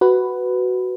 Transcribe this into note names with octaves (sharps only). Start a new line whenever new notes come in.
F#4 B4